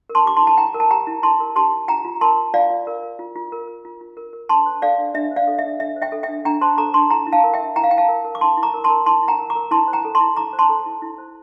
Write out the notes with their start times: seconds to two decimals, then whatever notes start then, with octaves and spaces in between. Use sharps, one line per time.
0.09 A#4
0.15 A5 C6
0.25 G4 D6
0.37 A5 C6
0.42 E4
0.47 A5
0.58 E4 G5 A#5
0.74 A#4
0.80 A5
0.91 G4 G5 A#5
1.07 E4
1.23 E4 A5 C6
1.40 A#4
1.56 G4 A5 C6
1.72 E4
1.88 F4 G5 A#5
2.05 F4
2.21 A#4 A5 C6
2.37 A#4
2.54 F4 D5 F5
2.70 F4
2.87 A#4
3.03 A#4
3.19 F4
3.36 F4
3.52 A#4
3.68 A#4
3.85 F4
4.01 F4
4.17 A#4
4.33 A#4
4.49 D4 A5 C6
4.66 C5
4.82 A4 D5 F5
4.98 D4
5.14 D4 E5
5.31 C5
5.36 D5 F5
5.47 A4
5.59 E5
5.64 D4
5.80 D4 E5
5.96 C5
6.02 E5 G5
6.12 A4
6.23 E5 G5
6.28 D4
6.45 D4 G5 A#5
6.61 C5 A5 C6
6.78 A4 A#5 D6
6.94 D4 A5 C6
7.10 E4 G5 A#5
7.27 E4
7.33 F5 A5
7.44 A#4
7.54 E5 G5
7.60 A#4
7.76 E4 G5 A#5
7.84 F5
7.91 E4 G5
7.98 F5 A5
8.09 A#4
8.25 A#4
8.35 D6
8.41 E4 A5 C6
8.57 E4
8.63 A#5 D6
8.74 A#4
8.84 A5 C6
8.90 A#4
9.06 E4 A5 C6
9.23 E4
9.28 G5 A#5
9.39 A#4
9.50 A#5 D6
9.55 A#4
9.71 E4 A5 C6
9.88 C5
9.93 G5 A#5
10.05 A4
10.15 A5 C6
10.21 E4
10.37 E4 A#5 D6
10.53 C5
10.59 A5 C6
10.69 A4
10.86 E4
11.02 E4
11.18 C5